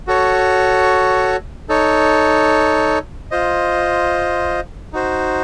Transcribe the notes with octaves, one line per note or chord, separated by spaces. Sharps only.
F#4 A4 C#5
D#4 A4 C#5
F4 C5 D#5
D#4 F#4 C5